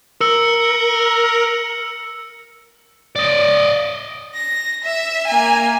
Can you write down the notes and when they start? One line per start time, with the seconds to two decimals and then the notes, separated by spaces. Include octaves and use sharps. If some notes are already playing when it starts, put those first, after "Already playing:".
0.21 A#4 E6 C#7
3.16 D5 D#5
4.36 A#6
4.84 E5
5.27 A#3 G#5